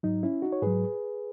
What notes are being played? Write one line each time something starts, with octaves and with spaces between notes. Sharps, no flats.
G#2 F#3 D#4
C#4 E4
D#4 F#4
C#5
G#2 F#3 G#4 B4